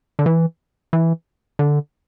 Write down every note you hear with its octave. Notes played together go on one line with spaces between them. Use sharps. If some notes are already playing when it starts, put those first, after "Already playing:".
D3
E3
E3
D3